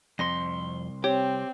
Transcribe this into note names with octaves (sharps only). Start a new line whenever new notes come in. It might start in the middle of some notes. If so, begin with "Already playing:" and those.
C2 F2 C6 A#6
C4 G4 C#5